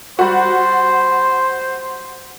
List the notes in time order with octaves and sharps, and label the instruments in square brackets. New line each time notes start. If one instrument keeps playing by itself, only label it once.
[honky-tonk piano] G3 F#4 [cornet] C5